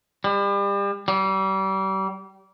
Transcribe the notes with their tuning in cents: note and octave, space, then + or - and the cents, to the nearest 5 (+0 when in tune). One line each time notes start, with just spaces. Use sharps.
G3 +35
G3 -35